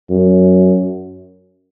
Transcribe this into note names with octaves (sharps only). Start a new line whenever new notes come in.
F#2